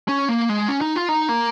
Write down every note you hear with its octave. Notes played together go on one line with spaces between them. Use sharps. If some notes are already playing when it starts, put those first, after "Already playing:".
C#4
A#3
G#3
C#4
D#4
F4
D#4
A#3